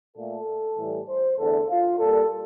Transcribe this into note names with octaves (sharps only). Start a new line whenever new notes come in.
A#2 A3 A4
A2 E3 G3
C5
E2 D3 A3 A4
F4
A#2 G3 A#3 A4